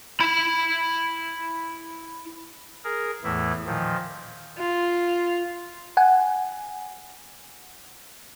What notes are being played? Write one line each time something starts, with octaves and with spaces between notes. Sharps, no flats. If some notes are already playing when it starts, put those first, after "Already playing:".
E4 B5
G#4 A#4
E2 A2 E3 A3 E4
A#2 D#3 F3
F4
F#5 G#5